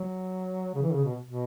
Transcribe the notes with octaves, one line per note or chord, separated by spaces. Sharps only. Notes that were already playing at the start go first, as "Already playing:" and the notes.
Already playing: F#3
C#3
E3
C#3
B2
B2